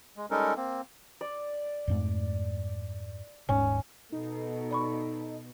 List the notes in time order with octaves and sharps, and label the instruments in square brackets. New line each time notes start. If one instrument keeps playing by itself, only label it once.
[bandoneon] G#3
G3 G#3 C#4 D#4 A4 A#4
A#3 C4
[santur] D5
[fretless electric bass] F2 G#2 A3
[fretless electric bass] D#1 G#2 [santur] C#4
[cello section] B2 [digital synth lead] D#4 [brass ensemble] A4
[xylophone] D5 B5 C#6